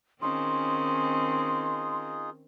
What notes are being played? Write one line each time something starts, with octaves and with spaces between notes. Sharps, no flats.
D#3 C4 C#4 D#4 F4 G#4 C6